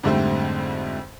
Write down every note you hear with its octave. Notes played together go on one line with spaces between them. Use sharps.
F2 G#2 D3 G3 A3 C4